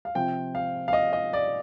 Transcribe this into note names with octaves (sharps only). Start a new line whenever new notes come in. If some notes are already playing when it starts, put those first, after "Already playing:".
F5
C3 F3 C4 G5
F5
F5
D#5
D#5
D5